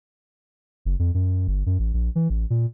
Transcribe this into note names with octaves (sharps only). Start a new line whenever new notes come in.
F#1
F2
F#2
G1
F#2
A1
A#1
E3
A1
A#2